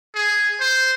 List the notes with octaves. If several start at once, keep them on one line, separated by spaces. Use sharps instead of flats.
G#4
C5